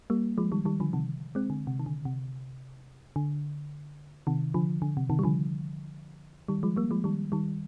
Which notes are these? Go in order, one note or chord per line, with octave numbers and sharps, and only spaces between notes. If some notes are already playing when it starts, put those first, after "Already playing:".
G3 A#3
F3 G#3
D#3 G3
D#3 G3
D3 F3
C3 D#3
G#3 C4
D3
C3
D#3
D3
C3
D3
C3 D#3
D3 F3
D3
C3
C3 D#3
G3
D3 F3
D#3 G3
F3 G#3
G3 A#3
F3 G#3
D#3 G3
D#3 G3